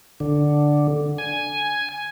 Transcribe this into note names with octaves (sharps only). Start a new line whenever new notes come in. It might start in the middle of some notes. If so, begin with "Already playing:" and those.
D3
G#5